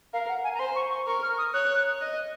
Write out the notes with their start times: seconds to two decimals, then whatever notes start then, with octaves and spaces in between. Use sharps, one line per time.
0.13 A#4 F5
0.29 F#5
0.44 G#5
0.55 A#5
0.59 C5 C6
0.76 C#6
0.91 C#6
1.07 A#4 C#6
1.23 F6
1.38 D#6
1.54 C#5 F#6
2.01 D#5